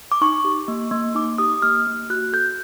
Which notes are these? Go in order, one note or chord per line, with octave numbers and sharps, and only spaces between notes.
D6
D#4 C#6
G4
A#3
A#3
D#4 D6
G4 D#6
A#3 F6
A#3
F#4 F#6
A4 G6